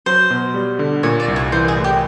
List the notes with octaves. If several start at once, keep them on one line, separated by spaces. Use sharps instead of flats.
F#3 C5
B2
G3
D3
A#2 C#5
D5
C2
C#5
E3 C5
G#4
A2
G4